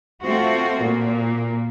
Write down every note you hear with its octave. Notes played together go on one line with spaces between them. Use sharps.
A3 C4 F4 F#4
A#2 A#3